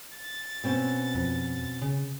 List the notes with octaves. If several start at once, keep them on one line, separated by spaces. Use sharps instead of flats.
A6
B2 C4 C#4
F2
C#3